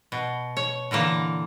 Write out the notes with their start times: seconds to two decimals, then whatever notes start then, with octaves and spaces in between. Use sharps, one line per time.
0.12 B2
0.57 C#5
0.91 A#2 D3 E3 A#3